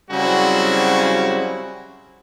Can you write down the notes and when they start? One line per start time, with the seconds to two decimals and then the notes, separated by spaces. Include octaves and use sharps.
0.11 C#3 F#3 G3 C4 E4 F#4